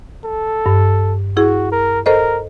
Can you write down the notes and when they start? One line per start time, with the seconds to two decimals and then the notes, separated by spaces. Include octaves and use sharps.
0.25 A4
0.66 G2
1.37 E4 F#4 G#4
1.72 A#4
2.06 A4 A#4 C5 D#5